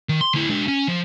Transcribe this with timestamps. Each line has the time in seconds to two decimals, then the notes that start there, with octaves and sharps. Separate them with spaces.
0.09 D#3
0.21 C6
0.34 D2 E4
0.50 G#3 D4
0.68 C#4
0.88 F3